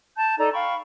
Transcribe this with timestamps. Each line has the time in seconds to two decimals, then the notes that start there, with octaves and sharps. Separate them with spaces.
0.16 A5 G6
0.38 D#4 A4 D5 A#5
0.53 F5 G5 B5 C#6